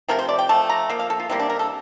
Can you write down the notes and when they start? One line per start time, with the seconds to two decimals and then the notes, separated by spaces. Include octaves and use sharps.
0.08 C3 F3 A3 A#4
0.19 C5
0.29 D5
0.39 G5
0.49 F3 A3 A5
0.69 A#5
0.89 F3 A#3
0.99 F5
1.10 A4
1.20 F4
1.29 C3 G3 A#3 E4
1.39 D4
1.49 A#4
1.59 A4